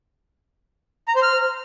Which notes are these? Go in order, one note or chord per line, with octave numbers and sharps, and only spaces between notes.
A#5
C5
F6